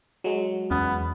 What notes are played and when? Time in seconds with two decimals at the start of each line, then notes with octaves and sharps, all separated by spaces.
0.24 F#3 G#3
0.71 E2 B3 C#4